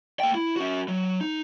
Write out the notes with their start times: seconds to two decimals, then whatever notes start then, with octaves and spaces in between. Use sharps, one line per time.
0.20 A#3 G5
0.35 E4
0.56 C#4 F#4
0.88 F#3
1.21 D#4